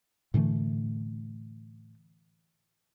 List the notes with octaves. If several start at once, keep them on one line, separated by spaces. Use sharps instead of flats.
A2 D3 E3 A3